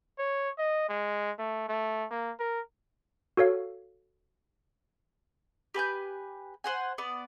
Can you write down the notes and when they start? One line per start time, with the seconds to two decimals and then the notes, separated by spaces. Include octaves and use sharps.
0.18 C#5
0.58 D#5
0.89 G#3
1.38 A3
1.69 A3
2.11 A#3
2.39 A#4
3.37 F#4 A4 C#5 F5
5.74 G4 B4 G#5 G6
6.64 C5 F#5 G#5
6.98 B3 D5